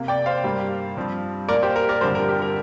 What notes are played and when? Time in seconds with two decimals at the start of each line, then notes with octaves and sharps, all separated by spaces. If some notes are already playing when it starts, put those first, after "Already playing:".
Already playing: C3 A#3
0.08 D5 G5
0.26 C5 F5
0.43 G2 G3 A#3
0.97 G2 F3 C4
1.49 A#2 A#3 A#4 D5
1.62 G4 C5
1.76 A#4
1.89 A#4 D5
2.01 G2 D3 F3 C4 G4 C5
2.15 A#4
2.28 G4
2.42 A#4